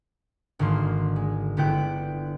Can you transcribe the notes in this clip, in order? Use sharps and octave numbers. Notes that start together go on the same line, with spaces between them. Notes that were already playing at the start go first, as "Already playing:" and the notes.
G#1 G#2 D3 A#3 C6
G#3
G1 D3 B3 E4 G5 F#6